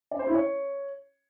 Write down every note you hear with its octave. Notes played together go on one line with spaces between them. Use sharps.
D5
C5
E4
C#5